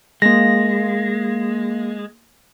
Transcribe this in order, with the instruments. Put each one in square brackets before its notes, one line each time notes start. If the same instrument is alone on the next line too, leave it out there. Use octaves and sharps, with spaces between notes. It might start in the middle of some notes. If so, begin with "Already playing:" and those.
[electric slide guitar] G#3 [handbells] A#3 A#6